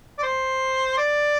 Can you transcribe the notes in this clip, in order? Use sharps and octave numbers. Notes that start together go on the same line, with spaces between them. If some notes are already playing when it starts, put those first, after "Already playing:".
D5
C5
D5